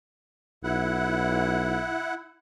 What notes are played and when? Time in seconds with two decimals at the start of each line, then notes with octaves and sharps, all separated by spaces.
0.64 B1 E4 F#5